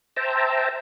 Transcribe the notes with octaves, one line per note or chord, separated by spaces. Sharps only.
C5 E5 G5 A5 A#5